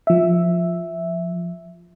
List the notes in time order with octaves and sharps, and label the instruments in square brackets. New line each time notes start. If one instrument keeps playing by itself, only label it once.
[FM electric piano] F3 E5